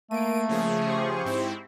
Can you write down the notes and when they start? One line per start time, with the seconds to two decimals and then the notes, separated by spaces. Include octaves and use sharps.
0.11 A3 A#3 D7 D#7
0.49 C#3 F3 G#4
0.86 G4 C5 C#6
1.25 G#2 C4 E4